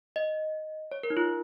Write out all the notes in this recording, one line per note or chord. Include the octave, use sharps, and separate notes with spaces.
D#5
C#5
A#4
D#4
F4